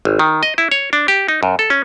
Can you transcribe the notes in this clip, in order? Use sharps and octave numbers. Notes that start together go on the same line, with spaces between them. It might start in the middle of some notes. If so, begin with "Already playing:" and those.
G#1
D#3
D#5
E4
C#5
D4
G4
D#4
F#2
A4
C#4